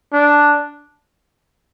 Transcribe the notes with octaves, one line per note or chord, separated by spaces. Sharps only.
D4